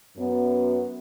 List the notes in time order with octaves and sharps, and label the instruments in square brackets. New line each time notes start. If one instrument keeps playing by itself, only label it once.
[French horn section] F#2 B3